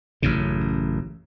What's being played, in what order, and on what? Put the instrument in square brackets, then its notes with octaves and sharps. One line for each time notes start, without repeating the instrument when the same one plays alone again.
[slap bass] A1 F#2 C#3